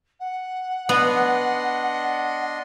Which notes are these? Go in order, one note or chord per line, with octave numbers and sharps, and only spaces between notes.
F#5
B3 D4 D#5 C6